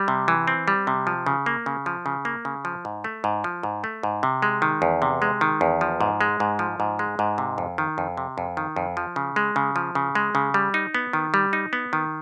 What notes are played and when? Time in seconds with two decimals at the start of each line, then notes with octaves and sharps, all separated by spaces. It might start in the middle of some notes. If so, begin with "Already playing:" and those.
Already playing: G3
0.08 C3
0.28 E3
0.48 C4
0.68 G3
0.87 C3
1.07 F3
1.26 C#3
1.46 A#3
1.66 C#3
1.86 F3
2.06 C#3
2.25 A#3
2.45 C#3
2.65 F3
2.85 G#2
3.04 A3
3.24 G#2
3.44 F3
3.63 G#2
3.84 A3
4.03 G#2
4.23 C3
4.42 G#3
4.62 D#3
4.82 E2
5.02 C3
5.22 G#3
5.41 D#3
5.61 E2
5.81 F3
6.01 G#2
6.21 G#3
6.40 G#2
6.59 F3
6.80 G#2
6.99 G#3
7.19 G#2
7.38 C3
7.58 F2
7.78 D#3
7.98 F2
8.17 C3
8.38 F2
8.57 D#3
8.76 F2
8.97 F3
9.16 C#3
9.36 G#3
9.56 C#3
9.76 F3
9.95 C#3
10.15 G#3
10.35 C#3
10.54 G3
10.74 D#4
10.95 B3
11.13 D#3
11.34 G3
11.53 D#4
11.73 B3
11.93 D#3